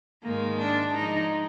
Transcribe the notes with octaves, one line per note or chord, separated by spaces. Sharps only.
G#2 D#3 G#3 A#3
D4
F3 G#3 D4 D#4